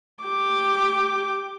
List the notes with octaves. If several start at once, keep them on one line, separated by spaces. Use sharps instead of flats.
G4 D6